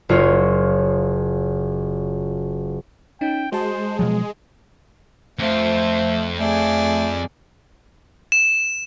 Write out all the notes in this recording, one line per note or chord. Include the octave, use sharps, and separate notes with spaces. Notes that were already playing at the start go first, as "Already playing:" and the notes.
F#1 F4 C#5
C#4 D#4 G5
G#3 F#4 C5 A5
B2 F3 F#3 G#4
F2 A3 F4 C5
A3 G#4 D5
E7